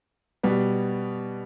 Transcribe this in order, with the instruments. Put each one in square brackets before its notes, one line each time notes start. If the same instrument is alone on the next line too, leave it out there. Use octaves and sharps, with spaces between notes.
[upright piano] B2 G3 B3